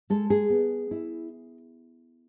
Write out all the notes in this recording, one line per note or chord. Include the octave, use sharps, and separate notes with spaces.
G#3 A4
G#4
B3
E4